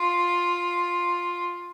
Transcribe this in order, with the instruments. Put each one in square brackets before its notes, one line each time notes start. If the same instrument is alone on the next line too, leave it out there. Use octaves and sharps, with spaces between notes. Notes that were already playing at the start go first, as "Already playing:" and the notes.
Already playing: [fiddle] F4